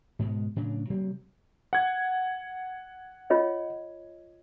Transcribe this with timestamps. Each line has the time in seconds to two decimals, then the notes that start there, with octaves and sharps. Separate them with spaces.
0.19 G#2 B2 G#3
0.56 A2 C#3 F#3 D4
0.90 C3 F#3 A#3 C4
1.73 F#5 G#6
3.30 F4 C#5 D#5